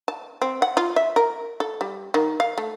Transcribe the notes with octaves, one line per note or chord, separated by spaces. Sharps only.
A5
C4
F#5
F4
E5
A#4
A4
G3
D#3
F5
A3